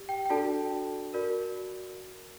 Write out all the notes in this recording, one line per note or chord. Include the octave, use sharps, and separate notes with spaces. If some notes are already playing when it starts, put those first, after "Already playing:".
Already playing: G4
G5
G5
D4 F#4 A4 D5 A5
F#4 A#4 D5